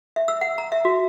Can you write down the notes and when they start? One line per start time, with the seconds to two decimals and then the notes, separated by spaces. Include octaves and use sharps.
0.16 E5
0.28 E6
0.41 F#5
0.58 A#5
0.72 E5
0.85 F#4